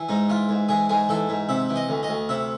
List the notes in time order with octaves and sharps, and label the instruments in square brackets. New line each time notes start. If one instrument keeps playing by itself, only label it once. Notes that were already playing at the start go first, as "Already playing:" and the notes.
Already playing: [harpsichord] E3
G#2 D#4
E3 F4
G#2
E3 G#4
G#2 G#4
E3 A4
G#2
C3 E5
E3
D#5
D2
D#5
D2
C3 E5